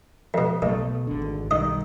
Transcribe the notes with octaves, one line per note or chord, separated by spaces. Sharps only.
F2 B2
B1 B2 A3
G#1 D3
B1 D#3 G3 D#5